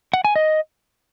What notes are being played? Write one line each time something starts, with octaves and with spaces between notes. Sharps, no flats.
F#5
G#5
D#5